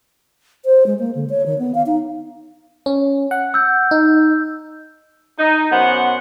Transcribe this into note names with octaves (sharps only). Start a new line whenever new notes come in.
C5
G#3
A#3
D3
C#5
D#3
B3
F5
D#4
C#4
F#5
E6 G6
D#4
D#4
F#2 B3 C5 F#5